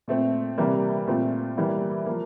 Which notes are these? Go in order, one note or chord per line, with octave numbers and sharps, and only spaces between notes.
A#2 A3 C4
C3 E3 G3 A#3
A#2 A3 C4 F4
E3 G3 A#3 E4
F3 A#3